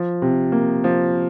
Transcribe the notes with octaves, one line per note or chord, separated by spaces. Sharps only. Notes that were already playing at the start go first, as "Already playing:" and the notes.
Already playing: F3
C3
A#3
F3